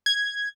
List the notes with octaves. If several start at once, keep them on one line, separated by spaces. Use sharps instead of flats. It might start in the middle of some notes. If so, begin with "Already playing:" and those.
G#6